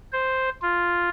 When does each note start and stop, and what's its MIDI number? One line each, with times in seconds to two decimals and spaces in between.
0.13 0.50 72
0.62 1.09 65